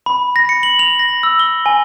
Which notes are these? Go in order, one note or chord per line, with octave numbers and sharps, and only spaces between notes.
B5
A#6
C#7
F#7
F7
A#6
E6
G7
G#5